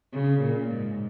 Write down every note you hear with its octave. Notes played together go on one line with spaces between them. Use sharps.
C#3
A#2
G#2